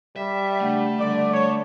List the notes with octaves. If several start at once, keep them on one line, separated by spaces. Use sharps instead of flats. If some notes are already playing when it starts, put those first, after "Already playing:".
G3 E5
C#3 A3 D4 F#5
D3 G3 D5
C#5